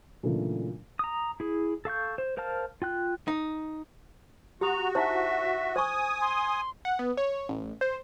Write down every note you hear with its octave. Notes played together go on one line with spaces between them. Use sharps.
A#2 C#3 E3 F#3 A3 D4
A#5 D#6
E4 G#4
A4 F5 C#6 G6
C5
A#4 C5 F5 A5 F6
F4 G5 F#6
D#4
F#4 G4 A#5 D#6
D#4 E4 C5 E5
C5 G#5 C#6 D#6
C6
F#5
B3
C#5
A1
C5